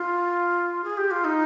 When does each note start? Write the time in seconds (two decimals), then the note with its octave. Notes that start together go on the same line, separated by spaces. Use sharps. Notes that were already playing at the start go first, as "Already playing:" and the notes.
Already playing: F4
0.84 G#4
0.97 G4
1.11 F4
1.24 D#4